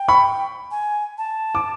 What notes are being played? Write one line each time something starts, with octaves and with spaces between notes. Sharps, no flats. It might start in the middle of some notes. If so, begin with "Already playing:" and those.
Already playing: G5
B5 C#6
G#5
A5
D6